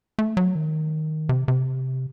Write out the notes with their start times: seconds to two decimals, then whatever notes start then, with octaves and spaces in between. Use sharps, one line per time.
0.19 A3
0.37 F#3
0.55 D#3
1.29 C3
1.48 C3